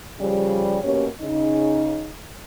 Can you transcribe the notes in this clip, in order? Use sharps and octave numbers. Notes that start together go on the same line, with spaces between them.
C#3 F3 G3
B2 A#3 C#4 G4 C#5
C#3 D#4